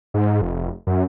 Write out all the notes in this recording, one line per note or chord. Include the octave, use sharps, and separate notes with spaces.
G#2
F1
F#2